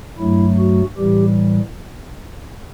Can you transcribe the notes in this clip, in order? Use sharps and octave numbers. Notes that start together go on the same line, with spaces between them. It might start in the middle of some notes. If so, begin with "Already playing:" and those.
G2 F#3 A3 E4
F#4
A2 E3 G3 G4